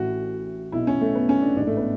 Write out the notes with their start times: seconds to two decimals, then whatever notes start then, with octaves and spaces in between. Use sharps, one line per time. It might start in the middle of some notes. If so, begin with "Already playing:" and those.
Already playing: A1 A2 E3 F#4
0.72 B1 B2 E4
0.87 C#4
1.01 A3
1.15 B3
1.29 C#4
1.42 D4
1.56 A1 G#2 E3 D4
1.67 A3
1.77 B3